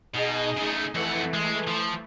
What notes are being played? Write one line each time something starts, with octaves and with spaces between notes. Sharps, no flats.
B2 D#4 G#4 D#5
C#3 A3
F2 E3 A3 F#5
G#3
F3